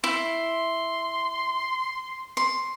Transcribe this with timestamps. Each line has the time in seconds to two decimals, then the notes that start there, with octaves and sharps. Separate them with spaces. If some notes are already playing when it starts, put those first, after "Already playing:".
0.04 E4 C6
2.37 C6